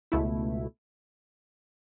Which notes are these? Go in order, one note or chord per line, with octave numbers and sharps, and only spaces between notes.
C#2 B2 A3 E4